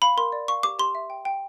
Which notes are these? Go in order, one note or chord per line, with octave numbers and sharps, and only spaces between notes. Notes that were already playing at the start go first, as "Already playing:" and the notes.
F5 B5
A#4 C6
D5
F5 C#6
G4 D6
G4 C6
E5
G5
G5